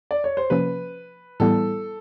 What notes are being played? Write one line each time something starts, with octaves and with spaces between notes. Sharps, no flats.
D5
C#5
C5
C3 F3 A#3 C#4 B4
A2 E3 G3 B3 E4 A4